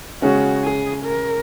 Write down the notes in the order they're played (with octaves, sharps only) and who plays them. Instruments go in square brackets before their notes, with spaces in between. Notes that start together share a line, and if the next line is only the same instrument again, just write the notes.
[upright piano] C#3 G#3 C#4 [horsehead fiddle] F#4
[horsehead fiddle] G#4
A#4